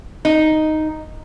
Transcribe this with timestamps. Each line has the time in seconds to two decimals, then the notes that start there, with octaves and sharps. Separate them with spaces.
0.25 D#4